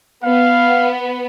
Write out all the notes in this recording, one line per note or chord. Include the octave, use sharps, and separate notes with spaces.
B3 F5